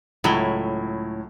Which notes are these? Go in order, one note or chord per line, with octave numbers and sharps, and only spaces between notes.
C#2 A2 F#3 E4 G7